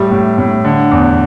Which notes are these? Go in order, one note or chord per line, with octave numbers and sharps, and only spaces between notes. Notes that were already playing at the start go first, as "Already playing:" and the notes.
Already playing: A2 G3
A2
A2
D3
E2